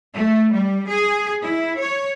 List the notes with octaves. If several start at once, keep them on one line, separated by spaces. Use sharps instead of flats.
A3
G3
G#4
E4
C#5